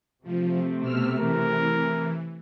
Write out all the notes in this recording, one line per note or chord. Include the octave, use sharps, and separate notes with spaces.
C3 F3 A3 C4
B2 E6 F6
E3 A#4